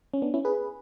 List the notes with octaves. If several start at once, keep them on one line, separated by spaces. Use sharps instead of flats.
C#4
B3 D4
C#4 E4
G#4 B4